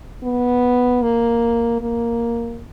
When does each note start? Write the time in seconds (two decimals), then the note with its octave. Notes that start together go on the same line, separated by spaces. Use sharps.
0.23 B3
1.02 A#3
1.82 A#3